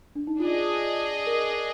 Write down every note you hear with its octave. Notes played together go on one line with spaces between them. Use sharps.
D4
D#4
D4 F4 G#4 D#5
A#4